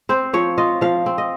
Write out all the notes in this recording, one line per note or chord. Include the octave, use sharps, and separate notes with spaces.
C4 C5
F3 C#5
F4 D#5
F3 F5
C4
D#5